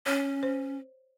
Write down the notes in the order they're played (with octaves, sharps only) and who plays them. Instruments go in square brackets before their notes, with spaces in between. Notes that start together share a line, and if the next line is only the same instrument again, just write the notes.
[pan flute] C#4 [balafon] C#5
[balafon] C5